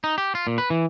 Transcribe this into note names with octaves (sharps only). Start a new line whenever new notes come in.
D#4
G4
F4
A#2
B4
E3